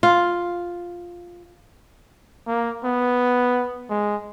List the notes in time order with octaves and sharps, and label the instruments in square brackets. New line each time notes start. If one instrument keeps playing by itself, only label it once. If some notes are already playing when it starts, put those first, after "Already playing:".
[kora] F4
[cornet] A#3
B3
G#3